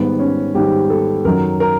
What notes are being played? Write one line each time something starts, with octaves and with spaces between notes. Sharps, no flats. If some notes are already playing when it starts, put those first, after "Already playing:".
Already playing: G#2 D#3 G3 B3
C#4
G#2 D#3 G3 G4
A4
F#2 D#3 F#3 A#4
A#4